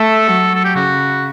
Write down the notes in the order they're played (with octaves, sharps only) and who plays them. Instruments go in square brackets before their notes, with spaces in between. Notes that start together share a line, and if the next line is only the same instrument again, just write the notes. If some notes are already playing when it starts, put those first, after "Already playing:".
Already playing: [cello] A3 [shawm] A4
[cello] F#3
[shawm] A4
G4
[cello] C#3 [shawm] F#4